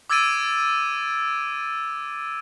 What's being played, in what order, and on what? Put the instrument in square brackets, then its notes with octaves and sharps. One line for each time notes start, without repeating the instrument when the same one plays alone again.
[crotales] D6 E6 G#6 A6 D7 D#7